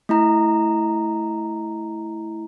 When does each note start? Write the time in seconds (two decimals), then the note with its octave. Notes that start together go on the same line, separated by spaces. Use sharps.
0.09 A3 E4 A#5